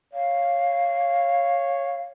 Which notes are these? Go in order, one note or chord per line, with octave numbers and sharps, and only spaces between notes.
C#5 F5